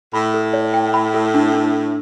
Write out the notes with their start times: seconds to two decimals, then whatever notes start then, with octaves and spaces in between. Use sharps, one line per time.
0.13 A2 B5
0.34 A4
0.53 C#5
0.74 G5
0.94 B5
1.14 A4
1.34 D4
1.54 D4